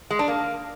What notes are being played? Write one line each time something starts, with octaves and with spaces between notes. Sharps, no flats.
G#3
D4
A#3